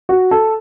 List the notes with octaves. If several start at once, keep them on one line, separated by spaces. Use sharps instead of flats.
F#4
A4